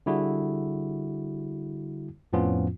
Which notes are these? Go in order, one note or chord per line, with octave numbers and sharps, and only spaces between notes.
D3 G3 E4 F#4 G#4
F2 A2 F3 B3 C#4 F4